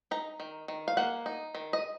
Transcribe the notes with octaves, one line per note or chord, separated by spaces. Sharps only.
D#4 A#5
D#3
D#3
F5
A#3 F#5
D#4
D#3
D#5